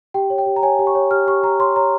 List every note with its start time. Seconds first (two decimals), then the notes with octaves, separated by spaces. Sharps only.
0.14 G4 G5
0.30 C#5
0.38 G5
0.46 G4
0.56 A#5
0.63 C#5 G#5
0.79 G4
0.87 C#6
0.95 C#5
1.11 G4 F6
1.27 G4 C#6
1.43 G4 A#5
1.59 C#5 C6
1.76 C#5 A#5